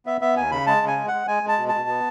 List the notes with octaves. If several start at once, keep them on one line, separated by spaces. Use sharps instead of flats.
B3 E5
B3 E5
D#2 G#5
C#3 B5
G#3 A5
C#3
G#5
G#3
G#3 F#5
G#3 G#5
G#3
A5
B2
A5
B2
B3